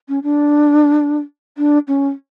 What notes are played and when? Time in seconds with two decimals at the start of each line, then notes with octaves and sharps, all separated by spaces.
0.09 C#4
0.23 D4
1.58 D4
1.88 C#4